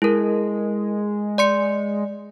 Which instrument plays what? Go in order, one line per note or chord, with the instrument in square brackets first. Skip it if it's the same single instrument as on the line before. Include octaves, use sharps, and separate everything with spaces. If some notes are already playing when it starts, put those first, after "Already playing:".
[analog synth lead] G#3 [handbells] E4 A#4
[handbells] D5 C6 C#7